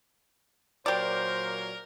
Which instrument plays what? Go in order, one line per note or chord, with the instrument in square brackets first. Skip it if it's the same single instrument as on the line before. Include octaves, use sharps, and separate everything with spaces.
[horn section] A#2 F#3 F5 [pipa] G4 D5 [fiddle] A#4 [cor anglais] C5